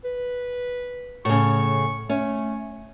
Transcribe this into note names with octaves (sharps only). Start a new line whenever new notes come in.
B4
A2 C#3 C#6
A3 C#4